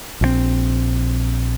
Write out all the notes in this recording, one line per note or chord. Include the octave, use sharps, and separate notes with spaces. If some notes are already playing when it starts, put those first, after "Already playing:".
A#1 E3 C4